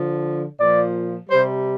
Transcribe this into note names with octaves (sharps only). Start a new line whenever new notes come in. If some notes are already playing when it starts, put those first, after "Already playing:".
Already playing: D3 F3
A#2 F3 D5
C3 G3 C5